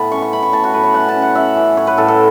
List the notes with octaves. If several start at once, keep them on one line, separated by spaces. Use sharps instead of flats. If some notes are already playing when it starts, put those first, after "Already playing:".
Already playing: A2 B3 F#5 A5 B5
C#4 C#6
C#6
E4 B5
C#6
A2 A5
F#4
A2 B4
C#5
C#4 F#5
A5
C#4
F#5
C#4 E5
E3
A2 C#5
B4
A2 A4
A4